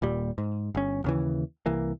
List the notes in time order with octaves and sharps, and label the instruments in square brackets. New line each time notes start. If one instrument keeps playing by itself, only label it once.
[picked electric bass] D#1 A#2 G3
G#2
G1 C#4
D#2 C#3 E3
C2 E3 A#3